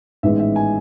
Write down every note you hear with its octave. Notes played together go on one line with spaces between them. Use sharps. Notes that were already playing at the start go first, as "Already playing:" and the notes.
A1 G#2 D#3 G#3 B3 E5
E5
G#5